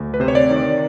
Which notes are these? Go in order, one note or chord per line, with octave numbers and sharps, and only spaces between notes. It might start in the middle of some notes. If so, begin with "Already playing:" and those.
Already playing: D2
B4
C3 C5
C#5
D5
D#3